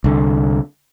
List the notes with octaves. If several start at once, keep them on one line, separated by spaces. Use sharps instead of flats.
C2 D3